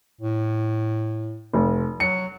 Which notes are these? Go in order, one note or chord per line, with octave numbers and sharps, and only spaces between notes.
A2
F1
F#3 C#7